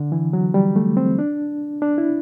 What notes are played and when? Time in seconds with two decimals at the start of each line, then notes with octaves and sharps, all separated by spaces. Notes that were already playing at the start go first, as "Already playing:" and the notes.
Already playing: D3
0.12 E3
0.33 F#3
0.54 G3
0.76 A3
0.97 C4
1.19 D4
1.82 D4
1.98 E4